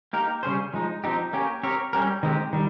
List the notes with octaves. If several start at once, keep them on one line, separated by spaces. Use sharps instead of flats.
A#3 D#4 G4 A#4
C#3 G3 C#4 G#4 C5
F3 G#3 D#4
F3 C4 D#4 G4
A#3 C#4 G4
C4 G4 A#4 C#5
G3 C#4 G4 A#4
D#3 G#3 C4 G4
D#3 G3